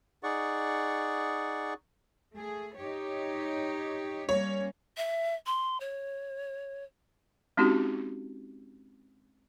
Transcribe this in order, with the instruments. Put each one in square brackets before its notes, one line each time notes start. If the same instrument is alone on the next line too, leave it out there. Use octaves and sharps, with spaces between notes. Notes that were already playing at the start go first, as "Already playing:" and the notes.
[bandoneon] D#4 G#4 D5 F#5 C#6
[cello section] A3 G#4
D#4 G4 C#5
[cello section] G3 A#3 C#4 [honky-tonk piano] C#5
[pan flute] E5
C6
C#5
[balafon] G#3 C4 C#4 D#4 F#4 G4